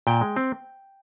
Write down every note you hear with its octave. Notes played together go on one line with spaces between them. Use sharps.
A#2 G5
G#3
C4